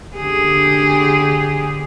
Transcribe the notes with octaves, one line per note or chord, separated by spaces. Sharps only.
D3 G4 G#4